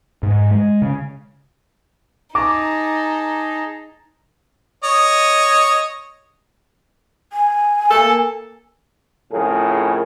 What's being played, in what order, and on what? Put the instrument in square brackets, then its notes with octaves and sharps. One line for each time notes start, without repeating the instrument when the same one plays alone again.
[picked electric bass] G#2
G#3
C#3
[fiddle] D#4 [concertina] G#4 A5 A#5 [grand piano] D6
[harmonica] C#5 D#5
[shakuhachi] G#5
[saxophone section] A#3 A4
[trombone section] F2 A2 C#3 G#4 A#4